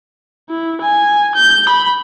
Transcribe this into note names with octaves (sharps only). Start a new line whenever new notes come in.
E4
G#5
G6
B5